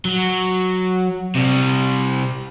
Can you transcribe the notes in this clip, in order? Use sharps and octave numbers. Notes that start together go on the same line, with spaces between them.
F#3
C3 G3